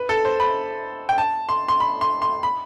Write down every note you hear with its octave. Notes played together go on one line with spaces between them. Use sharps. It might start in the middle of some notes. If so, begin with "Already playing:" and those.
Already playing: B4
A4
C5
B5
G5
A5
C6
C6
B5
C6
C6
B5